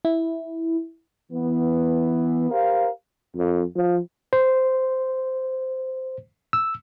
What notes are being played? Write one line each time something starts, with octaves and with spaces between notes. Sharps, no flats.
E4
E3 B3
G4 A#4 C5 F5
F2
F3
C5
E6